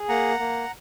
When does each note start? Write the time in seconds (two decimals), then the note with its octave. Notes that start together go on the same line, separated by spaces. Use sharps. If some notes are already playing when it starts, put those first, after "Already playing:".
Already playing: G#4
0.09 A#3 F#5 A#5
0.39 A#3